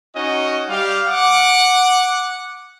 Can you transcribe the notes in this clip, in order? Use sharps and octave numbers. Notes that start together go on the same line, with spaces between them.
C#4 D#4 F#4 D#5
G3 G4 F5
F#5 D6